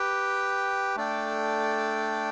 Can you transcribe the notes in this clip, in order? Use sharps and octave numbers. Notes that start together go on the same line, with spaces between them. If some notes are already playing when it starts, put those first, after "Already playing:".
Already playing: G4 B4 G5
A3 D4 A4 D5 G5